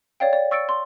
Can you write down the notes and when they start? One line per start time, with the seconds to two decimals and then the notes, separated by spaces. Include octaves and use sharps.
0.20 C#5 D5 F5 G5
0.33 D5
0.51 C#6 E6 A6 C#7 D7
0.69 C6